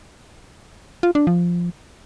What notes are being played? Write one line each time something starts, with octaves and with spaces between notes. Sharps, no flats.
F4
D4
F3